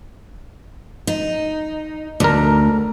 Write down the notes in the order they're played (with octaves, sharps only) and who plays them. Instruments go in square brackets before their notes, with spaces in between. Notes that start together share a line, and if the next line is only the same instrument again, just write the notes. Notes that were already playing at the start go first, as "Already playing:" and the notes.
[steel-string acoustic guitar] D#4
[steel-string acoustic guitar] D2 [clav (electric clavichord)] D4 A#4